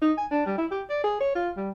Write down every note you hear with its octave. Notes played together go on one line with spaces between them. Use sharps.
D#4
G#5
D4
G3
E4
G4
D5
G#4
C#5
F4
G3